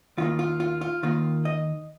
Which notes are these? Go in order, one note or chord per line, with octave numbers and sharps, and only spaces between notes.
D#2 D#3 A#3 F4
F4
F4
F4
D#2 D#3 A#3 F4
D#5